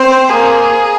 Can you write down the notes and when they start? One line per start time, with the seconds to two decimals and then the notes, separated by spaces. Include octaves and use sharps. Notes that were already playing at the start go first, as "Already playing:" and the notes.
Already playing: C4 C5
0.30 A#3 G#4